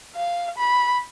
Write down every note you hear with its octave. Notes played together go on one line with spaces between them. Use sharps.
F5
B5